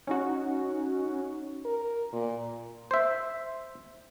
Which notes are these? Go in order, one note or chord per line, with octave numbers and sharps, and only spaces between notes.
C#4 D#4 F#4
A#4
A#2
C5 E5